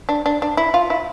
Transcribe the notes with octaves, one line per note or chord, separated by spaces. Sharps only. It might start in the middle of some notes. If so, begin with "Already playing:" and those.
D4
D4
D4
E4
F4
E4